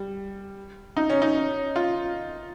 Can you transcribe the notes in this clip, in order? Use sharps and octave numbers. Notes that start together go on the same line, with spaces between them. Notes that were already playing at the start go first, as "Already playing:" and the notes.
Already playing: G3
D#4
C#4
D#4
F4